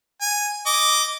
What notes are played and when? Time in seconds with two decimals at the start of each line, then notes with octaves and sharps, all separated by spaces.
0.22 G#5
0.66 D#5 D6